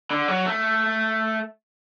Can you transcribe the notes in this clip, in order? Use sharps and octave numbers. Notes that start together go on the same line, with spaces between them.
D3
F#3
A3